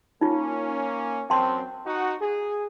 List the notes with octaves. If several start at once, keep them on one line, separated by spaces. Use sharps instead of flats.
A#3 C#4 D#4 F4
F#2 C4 G5 A5 C6
D#4 F#4
G#4